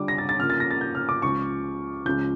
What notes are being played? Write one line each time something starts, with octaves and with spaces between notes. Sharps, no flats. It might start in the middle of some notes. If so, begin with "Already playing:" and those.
Already playing: D3 G3 D4 F4 D6
A#6
A6
A6
C#3 F3 A#3 F6
A6
A#6
A6
G6
F6
D6
C#2 C#3 F3 C#6
C#2 C#3 F3 G6